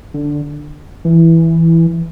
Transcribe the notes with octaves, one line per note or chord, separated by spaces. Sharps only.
D3
E3